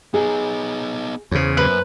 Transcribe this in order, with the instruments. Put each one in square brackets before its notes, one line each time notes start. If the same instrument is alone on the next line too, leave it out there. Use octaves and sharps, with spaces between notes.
[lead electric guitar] B3 D#4 [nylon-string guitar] G#4
[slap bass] E2 C#3 [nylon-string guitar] C5 C#5
[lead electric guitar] F#2 [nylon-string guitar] A#3 C5 [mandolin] B4